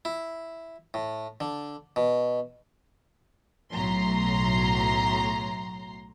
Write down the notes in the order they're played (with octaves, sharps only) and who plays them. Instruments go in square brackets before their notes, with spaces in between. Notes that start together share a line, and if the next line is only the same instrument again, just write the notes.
[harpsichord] E4
A2
D3
B2
[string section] B1 A2 F#3 A#5 C6 C7